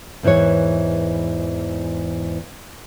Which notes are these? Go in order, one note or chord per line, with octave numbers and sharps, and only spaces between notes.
E2 G#2 E3 B4 C#5